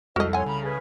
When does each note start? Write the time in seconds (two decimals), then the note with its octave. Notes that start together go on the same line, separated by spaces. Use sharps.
0.16 C2 F2 F#4 A4 C5 D#5 E5 F6
0.33 C#5 F#5 G#5 C6
0.46 C#3 A#5 B5
0.64 G#4 B4